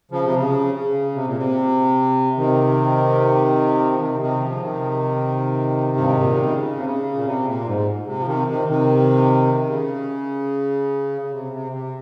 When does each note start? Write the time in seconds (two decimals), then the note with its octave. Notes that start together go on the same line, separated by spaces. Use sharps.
0.11 C#3 F3
0.24 C3
0.34 C#3
0.74 C#3
1.15 C3
1.26 A#2
1.36 C3
2.37 C3 D#3
3.92 F3
4.00 C3 D#3
4.20 C3 D#3
4.41 C#3 F3
4.52 C#3
4.61 C3 D#3
5.97 G2
6.09 G#2
6.21 A#2
6.33 C3
6.44 C#3
6.76 C3
6.85 C#3
7.15 A#2
7.25 C3
7.46 A#2
7.66 G#2
8.07 C3
8.20 F3
8.27 C3 D#3
8.47 C3 D#3
8.68 C3 D#3
9.58 C3
9.69 C#3
11.22 C#3
11.32 C3
11.52 C3
11.72 C3